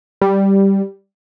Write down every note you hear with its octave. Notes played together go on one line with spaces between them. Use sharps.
G3